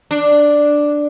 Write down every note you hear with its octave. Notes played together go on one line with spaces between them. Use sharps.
D4